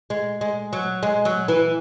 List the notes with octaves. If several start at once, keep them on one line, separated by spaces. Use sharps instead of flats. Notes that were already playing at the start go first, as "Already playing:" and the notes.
G#3
G#3
F#3
G#3
F#3
E3